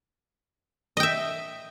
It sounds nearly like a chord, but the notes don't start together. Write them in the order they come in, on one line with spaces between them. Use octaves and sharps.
D#5 G5 E5